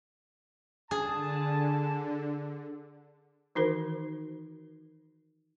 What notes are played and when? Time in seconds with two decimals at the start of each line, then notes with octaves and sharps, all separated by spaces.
0.91 D3 G#4 G#5 A5
3.55 D#3 E3 D#4 F#4 A#4 C5